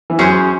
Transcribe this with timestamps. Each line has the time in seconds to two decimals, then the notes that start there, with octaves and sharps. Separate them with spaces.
0.10 E3
0.19 F#2 F#3 C#4 G#4 C5